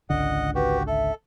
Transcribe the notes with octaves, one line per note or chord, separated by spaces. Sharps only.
G#1 C#2 D3 D#5 F#5
F#4 G4 B4
A4 E5